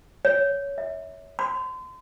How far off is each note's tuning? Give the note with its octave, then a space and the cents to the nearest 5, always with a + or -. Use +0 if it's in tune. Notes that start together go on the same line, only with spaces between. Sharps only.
C#5 +15
E5 -25
C6 -35